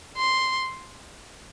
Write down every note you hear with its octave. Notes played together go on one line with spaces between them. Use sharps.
C6